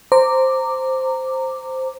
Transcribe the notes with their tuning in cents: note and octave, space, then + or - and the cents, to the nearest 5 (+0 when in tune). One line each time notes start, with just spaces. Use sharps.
C5 +0 A#5 -20 D6 +0